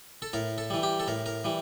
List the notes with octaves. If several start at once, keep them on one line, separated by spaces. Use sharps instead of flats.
A4
A2 A#4
A4
E3 G3
G4
A4
A2 A#4
A#4
E3 G3